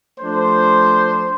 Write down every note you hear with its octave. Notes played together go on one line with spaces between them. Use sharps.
F3 A3 D4 C5